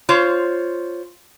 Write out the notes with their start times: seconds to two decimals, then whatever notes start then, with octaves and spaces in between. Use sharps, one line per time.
0.09 F4 C5 C#5